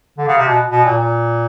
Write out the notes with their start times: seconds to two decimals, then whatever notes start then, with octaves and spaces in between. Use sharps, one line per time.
0.18 D3
0.28 C#3
0.38 C3
0.48 B2
0.71 B2
0.85 A#2
0.97 A#2